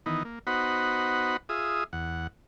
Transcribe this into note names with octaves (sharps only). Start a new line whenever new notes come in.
D#3 E3 B3 D#4
A#3
B3 D#4 F#4 C5 F#5 B5
F4 G#4 E5 D#6
E2 F#5